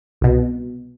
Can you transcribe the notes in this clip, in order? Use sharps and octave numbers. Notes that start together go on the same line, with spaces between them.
C2 B2